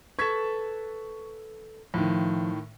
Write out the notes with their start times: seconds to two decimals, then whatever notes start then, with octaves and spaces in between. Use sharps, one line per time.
0.19 A4 B4 C#6 G#6 B6
1.94 A2 D#3 F3